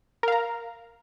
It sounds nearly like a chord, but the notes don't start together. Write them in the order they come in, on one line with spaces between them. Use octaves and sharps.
A#4 F5 A#5